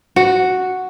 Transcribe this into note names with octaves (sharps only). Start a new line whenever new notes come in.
F#4